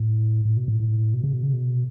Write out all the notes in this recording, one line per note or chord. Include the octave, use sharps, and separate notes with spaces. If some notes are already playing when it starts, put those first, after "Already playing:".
Already playing: A2
A2
B2
A2
A2
B2
C#3
B2
C#3
B2